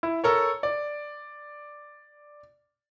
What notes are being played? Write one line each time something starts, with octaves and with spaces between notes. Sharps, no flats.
E4
A4 A#4 C#5
D5